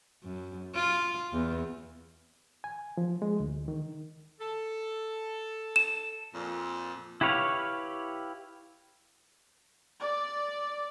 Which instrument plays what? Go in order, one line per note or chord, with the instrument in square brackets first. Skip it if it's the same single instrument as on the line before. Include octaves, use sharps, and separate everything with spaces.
[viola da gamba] F#2
F4
E2
[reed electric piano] G#5
F3
G#3
D2
D#3
[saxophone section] A4
[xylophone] E7
[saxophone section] F2 A#2
[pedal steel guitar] E4 G4 B4 C#5 F5
[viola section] D5